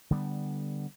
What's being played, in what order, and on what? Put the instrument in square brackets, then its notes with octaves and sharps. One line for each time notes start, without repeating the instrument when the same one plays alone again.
[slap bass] D3 G3 B3